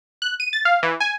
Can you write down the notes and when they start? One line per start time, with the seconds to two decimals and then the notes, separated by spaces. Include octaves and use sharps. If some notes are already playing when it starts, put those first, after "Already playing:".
0.22 F#6
0.40 D#7
0.53 A6
0.65 F5
0.83 E3
1.00 G#5